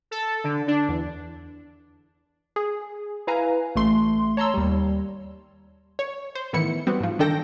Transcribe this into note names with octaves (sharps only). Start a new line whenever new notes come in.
A4
D3
D4
E2
G#4
E4 B4 F5 G#5 A#5
A1 A3 C6
C#5 A5 A#5 C6 E6
D#2 G3
C#5
C5
A2 D#3 E3 B3 E4 C#7
G3 B3 C4 F#4
G#2 F3
D3 D#3 D4 A4 G5 A#6